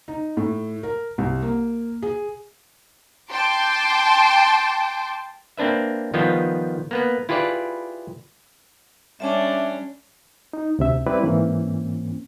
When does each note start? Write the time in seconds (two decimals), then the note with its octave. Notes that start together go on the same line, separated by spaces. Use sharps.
0.08 D#4
0.37 A2
0.83 A#4
1.18 C2
1.43 A#3
2.02 G#4
3.31 G5 A5 C6 D6
5.57 A#3 C4 D4 B4 E5
6.14 D#3 F3 G3 B3 F4
6.91 A#3 B3 B4
7.29 E4 F4 G4 G#4 B4 D5
9.20 G3 C#4 D4 E5 A5 D6
10.53 D#4
10.79 D2 C3 E5
11.07 G3 C4 E4 B4 D5
11.23 G#2 E3 A#3 C4 C#4